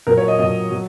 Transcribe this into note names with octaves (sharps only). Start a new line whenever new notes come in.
A#2 F#3 A#4
C#5
D#5
A#2 F#3 D#5
F#3